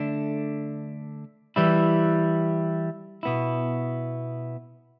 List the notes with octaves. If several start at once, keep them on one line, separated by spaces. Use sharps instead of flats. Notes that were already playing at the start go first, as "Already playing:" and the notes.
Already playing: D3 A3 D4
E3 G3 E4
B2 B3 E4